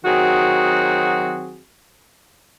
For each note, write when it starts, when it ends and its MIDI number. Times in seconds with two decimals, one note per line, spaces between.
0.05 1.60 51
0.05 1.60 54
0.05 1.60 60
0.05 1.60 66
0.05 1.60 68